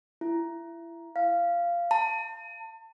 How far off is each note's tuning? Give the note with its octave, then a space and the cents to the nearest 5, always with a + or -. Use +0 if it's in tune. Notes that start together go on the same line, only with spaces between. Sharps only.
E4 +25
F5 -10
A5 +40